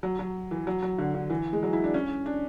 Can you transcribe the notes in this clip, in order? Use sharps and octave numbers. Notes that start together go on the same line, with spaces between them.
F#3
F#3
E3
F#3
F#3
D3
D3
E3
G#3
F#3
E4
D4
C#4
D4